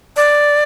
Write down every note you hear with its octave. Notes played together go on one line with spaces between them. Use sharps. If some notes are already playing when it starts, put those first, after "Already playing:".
D5